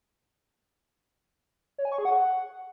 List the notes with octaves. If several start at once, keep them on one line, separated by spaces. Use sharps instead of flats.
C#5
G#5
C#6
G#4
F#5